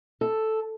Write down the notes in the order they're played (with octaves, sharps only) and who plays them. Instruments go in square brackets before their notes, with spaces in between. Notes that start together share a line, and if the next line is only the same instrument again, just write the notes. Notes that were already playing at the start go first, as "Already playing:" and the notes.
[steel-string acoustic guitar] A4